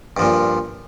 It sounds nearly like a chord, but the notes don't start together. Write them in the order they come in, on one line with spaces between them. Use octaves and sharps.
G2 F3 A#2